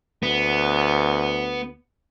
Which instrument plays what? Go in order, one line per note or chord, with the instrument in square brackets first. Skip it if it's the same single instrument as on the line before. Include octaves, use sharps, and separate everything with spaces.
[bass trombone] D2 [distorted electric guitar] B3